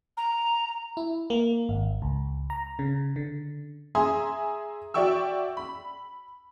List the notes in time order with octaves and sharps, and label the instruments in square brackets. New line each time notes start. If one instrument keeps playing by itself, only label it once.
[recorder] A#5
[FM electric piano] E4
A#3
G#1
C#2
A#5
C#3
D3
[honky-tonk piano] G#4 E5 G#5 A#5 C6 D#6
F#4 D5 E5 G5 C#6 E6
B5